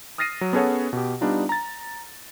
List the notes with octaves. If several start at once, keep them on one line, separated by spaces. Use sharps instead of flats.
D#6 F6 A6 A#6 C7 D#7
F#3
B3 C#4 G#4 A4 C#5 F#5
B2 G4
G3 B3 D4 D#4 F4
A#5 A6